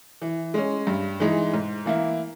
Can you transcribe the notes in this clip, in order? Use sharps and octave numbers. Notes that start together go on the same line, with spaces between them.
E3
G#3 C#4
G2
E3 G#3 D#4
G#2
E3 A#3 E4